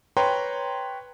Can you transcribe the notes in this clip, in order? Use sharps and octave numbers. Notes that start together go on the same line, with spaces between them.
B4 C#5 G5 A#5 C6